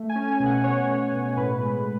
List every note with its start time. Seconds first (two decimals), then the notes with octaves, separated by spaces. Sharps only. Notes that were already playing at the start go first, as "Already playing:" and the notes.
Already playing: A3
0.09 G#5
0.15 C#4
0.27 G#5
0.40 B2
0.46 F#5
0.64 B2 C#5
0.88 B2
1.12 B2
1.37 A2 B4
1.61 G#3